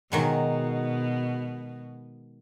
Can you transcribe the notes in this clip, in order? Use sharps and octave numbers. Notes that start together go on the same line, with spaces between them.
B2 D#3 F#3 G#3